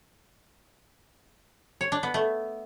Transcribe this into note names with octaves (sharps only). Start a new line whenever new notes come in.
C#5
D4
B3
A3